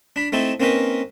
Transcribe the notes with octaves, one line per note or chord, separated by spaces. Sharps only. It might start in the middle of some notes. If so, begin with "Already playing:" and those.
D4 B5
A3 C4 D#4 E4 A4
A#3 C4 C#4 D#4 A#4 B4